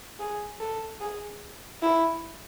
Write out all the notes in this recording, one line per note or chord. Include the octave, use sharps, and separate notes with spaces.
G#4
A4
G#4
E4